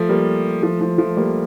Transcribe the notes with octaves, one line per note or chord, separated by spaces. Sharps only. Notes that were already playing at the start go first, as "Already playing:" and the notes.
Already playing: F3 A3
G3 A#3
F3 A3
F3
F3 A3
G3 A#3